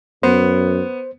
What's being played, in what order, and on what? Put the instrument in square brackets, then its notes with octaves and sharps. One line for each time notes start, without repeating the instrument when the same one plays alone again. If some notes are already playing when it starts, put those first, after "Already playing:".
[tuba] F#2 [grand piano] B3 [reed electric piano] C5